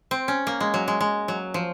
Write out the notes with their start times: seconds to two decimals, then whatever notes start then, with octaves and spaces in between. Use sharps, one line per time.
0.11 C4
0.28 C#4
0.47 A#3
0.60 G#3
0.74 F#3
0.88 G#3
1.01 G#3
1.28 F#3
1.54 F3